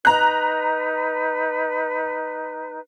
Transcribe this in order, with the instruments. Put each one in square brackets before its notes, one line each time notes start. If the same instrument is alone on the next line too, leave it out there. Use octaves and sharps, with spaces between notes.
[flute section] D#4 B4 [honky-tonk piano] A#5 F#6